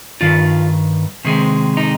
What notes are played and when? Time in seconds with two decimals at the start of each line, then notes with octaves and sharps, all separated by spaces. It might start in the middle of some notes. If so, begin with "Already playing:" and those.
0.21 G2 D#3 F4
1.25 C3 D#3 G#3
1.77 D#4